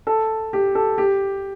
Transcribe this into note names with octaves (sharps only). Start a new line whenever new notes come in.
A4
G4
A4
G4